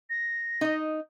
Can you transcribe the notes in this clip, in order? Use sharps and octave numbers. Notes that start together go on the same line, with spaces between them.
A#6
D#4 D#5